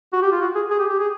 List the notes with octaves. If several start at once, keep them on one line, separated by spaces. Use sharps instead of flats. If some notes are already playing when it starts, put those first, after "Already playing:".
F#4
G4
F4
F#4
G#4
G#4
G4
G4
G#4